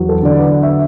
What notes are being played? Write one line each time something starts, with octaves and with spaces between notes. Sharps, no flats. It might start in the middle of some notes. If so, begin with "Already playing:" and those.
Already playing: E2 F#3
A4
D3 D5
B4
E5